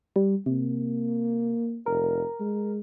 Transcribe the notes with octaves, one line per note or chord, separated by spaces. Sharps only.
G3
C3 A#3
F1 A#4
G#3